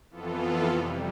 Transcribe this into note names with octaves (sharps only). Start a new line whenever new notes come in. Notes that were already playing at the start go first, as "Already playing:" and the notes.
F2 E3 B3 F4 A4
F2 C3 G3